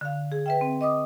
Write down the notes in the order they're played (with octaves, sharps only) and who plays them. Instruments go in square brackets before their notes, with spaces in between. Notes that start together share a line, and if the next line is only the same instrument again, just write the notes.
[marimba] D3 F5
G#4
B4 E5 G5
C4
D#5 D6 D#6